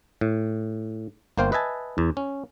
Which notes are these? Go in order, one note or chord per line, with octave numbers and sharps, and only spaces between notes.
A2
G1 A#3 C5 F5 G5
B4 D#5 E5 G#5 A5
E2
C#4